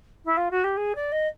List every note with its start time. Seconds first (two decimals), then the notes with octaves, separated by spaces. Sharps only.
0.24 E4
0.37 F4
0.50 F#4
0.63 G4
0.76 G#4
0.95 D5
1.12 D#5